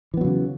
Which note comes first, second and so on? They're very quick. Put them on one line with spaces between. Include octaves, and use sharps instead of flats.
E3 B3 F#3 C#3